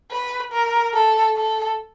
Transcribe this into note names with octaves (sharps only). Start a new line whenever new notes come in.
B4
A#4
A4
A4